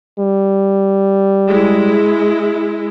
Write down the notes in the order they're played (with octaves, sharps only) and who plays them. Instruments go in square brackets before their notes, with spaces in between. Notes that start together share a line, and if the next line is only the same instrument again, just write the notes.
[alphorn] G3
[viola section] G#3 E4